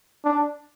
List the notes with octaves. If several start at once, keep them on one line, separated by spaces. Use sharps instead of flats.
D4